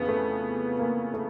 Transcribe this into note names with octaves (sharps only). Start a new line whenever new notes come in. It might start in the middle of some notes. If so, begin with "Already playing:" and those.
Already playing: F2 C#3 E3 B3
A3
A#3
A3